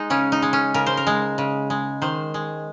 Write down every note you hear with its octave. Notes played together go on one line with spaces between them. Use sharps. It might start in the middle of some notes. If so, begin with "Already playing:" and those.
Already playing: G#3 D#4
C#3 C#4
D#4
G#3
C#4
C#3 A#4
C5
A#4
G#3
C#3
G#3
D#3 C5
G#3